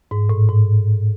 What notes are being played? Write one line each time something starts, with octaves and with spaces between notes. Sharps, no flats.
G#2
A2
G#2